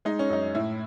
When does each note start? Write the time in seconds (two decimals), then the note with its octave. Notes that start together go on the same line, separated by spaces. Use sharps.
0.05 G#3 D#4
0.19 C#4
0.29 F#2 D#4
0.55 A2 E4